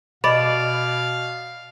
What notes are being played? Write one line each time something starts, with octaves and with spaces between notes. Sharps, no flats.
B2 D5 D#5 F5 B5